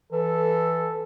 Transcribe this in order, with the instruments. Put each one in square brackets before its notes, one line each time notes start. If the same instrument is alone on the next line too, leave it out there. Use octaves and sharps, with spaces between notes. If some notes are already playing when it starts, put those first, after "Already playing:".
[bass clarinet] E3 [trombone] A4